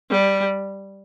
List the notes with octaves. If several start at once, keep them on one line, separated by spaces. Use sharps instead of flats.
G3